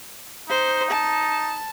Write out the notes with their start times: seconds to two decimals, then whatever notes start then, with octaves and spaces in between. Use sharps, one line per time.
0.49 D#4 C5
0.91 A5